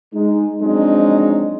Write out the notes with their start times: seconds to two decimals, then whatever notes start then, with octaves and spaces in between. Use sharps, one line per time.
0.13 G#3 D#4
0.61 F3 F#3 G#3 C4 D4 D#4